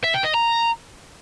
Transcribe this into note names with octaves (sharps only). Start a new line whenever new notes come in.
E5
G5
D#5
A#5